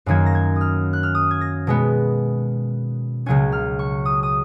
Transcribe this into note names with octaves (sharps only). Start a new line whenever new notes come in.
F#2 D#3 F#3 A#3 C#4 G#6
A#6
G#6
D#6 F6
F#6
F6
D#6
G#6
A#6
B2 G#3 B3
C#2 C#3 F#3 A#3 C#4 G#6
F6
C#6
D#6
D#6